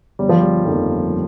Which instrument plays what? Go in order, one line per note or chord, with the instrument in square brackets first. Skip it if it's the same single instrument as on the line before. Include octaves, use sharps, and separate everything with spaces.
[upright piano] G1 [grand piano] G3
[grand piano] F3
G3
[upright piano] F2 D#3 A#3